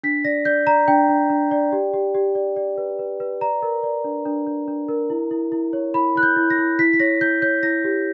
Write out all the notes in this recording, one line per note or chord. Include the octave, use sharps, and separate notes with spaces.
D4 B6
D5 A#6
D5 G6
D5 A#5
D4 G5
D4
D4
D5
G4
G4
G4
D5
D5
B4
B4
B4
D5 A#5
A#4
D5
D4
D4
D4
D4
A#4
E4
E4
E4
C#5
E4 B5
E4 F#6
G6
E4
A#6
E4
E4 B6
B6
C#5 A#6
E4 G6
C#5 G6
E4 A#6
G4